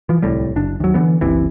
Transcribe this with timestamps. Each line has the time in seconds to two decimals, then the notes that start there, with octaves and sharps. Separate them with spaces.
0.09 E3 F3
0.22 D1 C2 A2 G3
0.56 F#1 D4
0.80 D#2 F#3
0.94 D3 E3 F#3 B3
1.21 F#1 C2 C3 E3